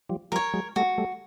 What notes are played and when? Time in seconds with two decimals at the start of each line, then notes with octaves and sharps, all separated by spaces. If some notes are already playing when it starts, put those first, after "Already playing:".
0.09 F3 G3
0.32 F3 G3 A#4
0.36 C#5
0.54 F#3 G#3
0.76 G3 A3 F#4
0.98 G3 A3